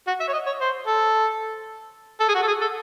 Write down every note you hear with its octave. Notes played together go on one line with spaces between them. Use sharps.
F#4
E5
C#5
D#5
C#5
C5
A4
A4
G#4
F#4
A4
G#4
A4